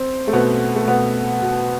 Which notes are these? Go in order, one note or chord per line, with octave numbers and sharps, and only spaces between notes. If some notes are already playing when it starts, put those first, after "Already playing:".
Already playing: C4
A3
B2 B3
A3
B2 B3
B2